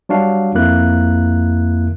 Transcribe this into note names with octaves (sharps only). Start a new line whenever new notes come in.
F#3 G3 D4 F#4 F5
F2 A#3 E4 F#6